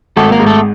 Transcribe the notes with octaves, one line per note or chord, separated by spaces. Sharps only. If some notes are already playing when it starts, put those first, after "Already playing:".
G#1 A3 A4
A#3 A#4
G#2
A3 A4